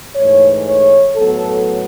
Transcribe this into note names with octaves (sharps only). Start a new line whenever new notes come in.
G#2 E3 A3 C#5
C#5
A2 F#3 B3 A4